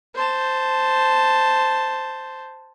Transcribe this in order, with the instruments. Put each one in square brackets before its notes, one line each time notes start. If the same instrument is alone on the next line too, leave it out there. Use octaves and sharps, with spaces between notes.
[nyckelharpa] C5 A5